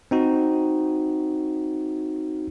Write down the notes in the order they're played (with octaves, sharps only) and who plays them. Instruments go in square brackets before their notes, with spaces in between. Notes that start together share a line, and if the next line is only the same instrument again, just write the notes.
[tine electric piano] C4 D#4 F#4